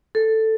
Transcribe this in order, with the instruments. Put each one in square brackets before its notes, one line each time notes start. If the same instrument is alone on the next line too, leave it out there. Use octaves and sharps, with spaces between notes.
[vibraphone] A4